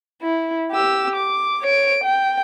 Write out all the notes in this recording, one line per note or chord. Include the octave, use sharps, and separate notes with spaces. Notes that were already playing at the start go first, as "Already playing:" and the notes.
E4
G4 E6
D6
C#5 D7
G5